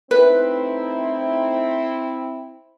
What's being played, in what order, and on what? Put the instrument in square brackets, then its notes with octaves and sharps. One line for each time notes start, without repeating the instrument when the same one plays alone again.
[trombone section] A3 D#4 C5 [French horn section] C4 E4 [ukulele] B4